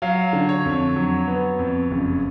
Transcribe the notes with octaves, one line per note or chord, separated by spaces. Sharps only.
F#3 F5
D3
C#5
F2
F#3
B3
F2
F#1